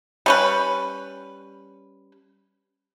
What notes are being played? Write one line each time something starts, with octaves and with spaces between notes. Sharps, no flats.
G3 C#4 B4